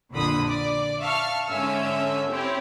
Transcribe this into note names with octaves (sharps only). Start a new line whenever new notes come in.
A#1 F2 A#2 D3 B5 D#6
D5
E5 F5 A5 C#6 F6
G#2 D3 C#4 E5 E6
C4 E4 G4 C#5